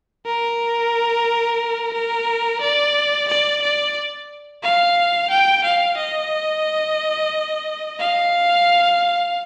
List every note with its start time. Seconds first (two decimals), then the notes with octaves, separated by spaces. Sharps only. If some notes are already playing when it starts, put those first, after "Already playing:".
0.26 A#4
1.94 A#4
2.61 D5
3.29 D5
3.62 D5
4.63 F5
5.30 G5
5.64 F5
5.98 D#5
7.99 F5